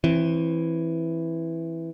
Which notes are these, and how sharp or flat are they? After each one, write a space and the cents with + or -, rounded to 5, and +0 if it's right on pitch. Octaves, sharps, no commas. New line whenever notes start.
E3 +0 C4 +25